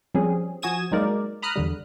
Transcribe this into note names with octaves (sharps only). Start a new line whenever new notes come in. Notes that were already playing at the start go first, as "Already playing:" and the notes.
F3 G3 C4 C#4 G#4
F3 F#4 G#5 D#6 G#6 E7
F#3 G#3 A#3 D#4 A#4 D5
A#5 B5 D#6 F6 F#6
E2 D3 G3